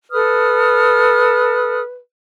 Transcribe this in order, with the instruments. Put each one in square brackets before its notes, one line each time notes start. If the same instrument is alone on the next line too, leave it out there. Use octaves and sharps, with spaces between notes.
[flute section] A4 D#6 F6 [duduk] B4